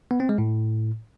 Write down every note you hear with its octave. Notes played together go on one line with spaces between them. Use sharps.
B3
C4
G#3
A2